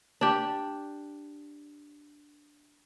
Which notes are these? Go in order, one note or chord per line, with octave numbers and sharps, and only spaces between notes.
D4 G4